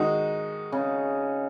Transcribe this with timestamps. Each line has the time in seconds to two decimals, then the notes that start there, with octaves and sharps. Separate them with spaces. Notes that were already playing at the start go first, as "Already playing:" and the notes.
Already playing: D#3 G#3 D#4 F#4
0.72 C#3